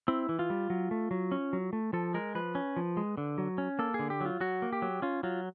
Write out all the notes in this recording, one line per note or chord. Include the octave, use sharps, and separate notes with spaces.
C4 E4
E3
F4
G3
F#3
A3
F#3
C#4
F#3
A3
F3 A4
G#3 A#4
F3 B4
C#4
F3
G#3
D3
F#3
C#4
A#3 A4
G#4
D3
G4
F#3 F4
F#3 F#4
A#3
G4
F#3
C#4 F4
F#3 F4